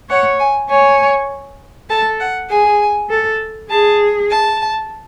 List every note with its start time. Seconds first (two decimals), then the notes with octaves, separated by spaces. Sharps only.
0.10 C#5 F#5
0.39 G#5
0.69 C#5 G#5
1.90 A4 A5
2.20 F#5
2.50 G#4 G#5
3.10 A4
3.70 G#4 A5
4.30 A5